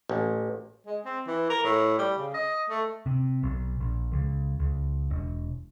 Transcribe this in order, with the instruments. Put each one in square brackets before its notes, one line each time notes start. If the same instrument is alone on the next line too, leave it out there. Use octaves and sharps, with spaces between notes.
[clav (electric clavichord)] A1
[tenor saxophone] G#3
C4
E3
A#4
A2
G3
C#3
D#5
A3
[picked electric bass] C3
B1
A#1
C#2
C#2
E1